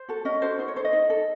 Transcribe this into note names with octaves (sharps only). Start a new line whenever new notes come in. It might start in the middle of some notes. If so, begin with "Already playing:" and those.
Already playing: C5
F#4 A4
C#4 D#5
F#4 A4 C5
D#4 C5
C#5
A4 C5
D#5
D#4
A4